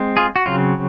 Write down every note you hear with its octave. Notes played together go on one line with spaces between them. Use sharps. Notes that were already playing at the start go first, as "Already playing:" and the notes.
Already playing: G#3 C4
F4 G#4
F#4
C#3 F#3 C4 F4